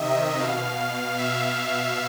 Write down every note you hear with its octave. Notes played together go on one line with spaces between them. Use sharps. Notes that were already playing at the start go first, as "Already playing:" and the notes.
Already playing: C3 D#3 D#5 E5
B2 F5
E5